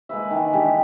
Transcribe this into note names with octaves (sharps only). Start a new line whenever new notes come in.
G#3 A#3 B4 E5
D#3 E3
G#3 D4 G4 G#4